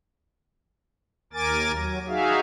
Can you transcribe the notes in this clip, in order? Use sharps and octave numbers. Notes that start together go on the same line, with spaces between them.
D#2 A#4 G#5 D6 A6
F#3
D#4 F#4 G#4 E5 F5